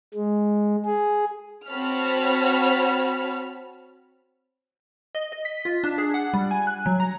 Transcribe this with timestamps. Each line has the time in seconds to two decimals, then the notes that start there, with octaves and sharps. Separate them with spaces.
0.14 G#3
0.85 G#4
1.69 C4 F#4 C#5 A5 B5 F6
5.15 D#5
5.32 D#5
5.45 B6
5.65 F4
5.84 D4
5.98 G#4
6.14 F#5
6.33 G3
6.51 G#5
6.67 F#6
6.86 F#3
7.00 A#5